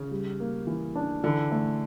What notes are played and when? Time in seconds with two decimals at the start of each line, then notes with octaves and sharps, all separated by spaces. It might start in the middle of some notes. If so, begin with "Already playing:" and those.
Already playing: C#3
0.11 G3
0.40 A#3
0.67 E3
0.96 D4
1.24 D3 E3
1.52 A3